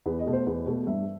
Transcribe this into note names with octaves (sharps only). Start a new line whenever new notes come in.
E2 B4
D#5
B2 A3
C5
E2 B4
B2 A3
G2 E5